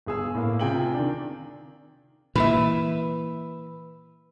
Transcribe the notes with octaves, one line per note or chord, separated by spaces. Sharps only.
G1 G#4 E6
A2 A#3 F5
C3 F4 G#4 G5 G#5 F#7
D#3 D4
A#2 E3 B4 E5